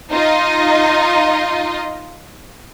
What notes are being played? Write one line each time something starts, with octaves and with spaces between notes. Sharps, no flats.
D#4 F4 D#5